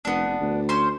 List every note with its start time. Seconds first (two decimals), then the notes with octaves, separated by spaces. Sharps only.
0.05 F1 B3 D4
0.27 F1
0.41 D2
0.69 C#4 C5 C6